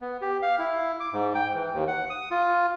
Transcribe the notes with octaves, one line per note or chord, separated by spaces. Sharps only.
B3
G4
F5
E4
D6
G#2
G5
E3
D#2
F#5
D#6
F4